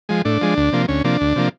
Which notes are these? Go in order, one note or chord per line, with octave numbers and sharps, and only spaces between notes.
F3 G#3
A2 D4
F3 G#3
D2
C3 F3 A#3
D2 C#4
C3 F3 A#3 D4
D2
C3 F3 A#3